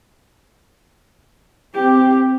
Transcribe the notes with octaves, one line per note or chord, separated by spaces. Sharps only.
C4 G4